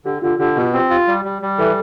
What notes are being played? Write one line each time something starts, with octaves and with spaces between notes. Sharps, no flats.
D3 G4
D3 F4
D3 G4
B2
C4
F4
G3
G3
G3
E3 A4